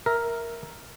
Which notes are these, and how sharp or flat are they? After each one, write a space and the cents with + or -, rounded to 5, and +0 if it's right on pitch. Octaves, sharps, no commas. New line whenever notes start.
A#4 +0 E5 -5